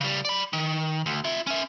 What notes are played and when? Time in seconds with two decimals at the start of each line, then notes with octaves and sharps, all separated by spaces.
0.01 C#3 G3
0.25 D5 B5
0.53 D#3
1.06 D2
1.24 F4 E5
1.47 C#4 E5